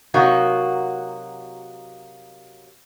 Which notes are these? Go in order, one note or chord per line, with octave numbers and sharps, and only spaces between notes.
C3 F#3 A#3 D#4 F#4